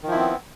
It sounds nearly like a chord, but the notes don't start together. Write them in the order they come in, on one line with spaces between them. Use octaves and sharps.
D#3 F3 E4 C4 B3